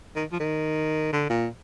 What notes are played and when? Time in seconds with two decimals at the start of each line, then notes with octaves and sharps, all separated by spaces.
0.16 D#3
0.32 F3
0.40 D#3
1.13 D3
1.30 A#2